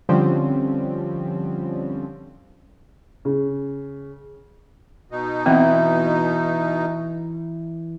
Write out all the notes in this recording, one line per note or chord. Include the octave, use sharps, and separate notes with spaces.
D3 F3 G3 C4 C#4
C#3
B2 D#4
E3 B3 C4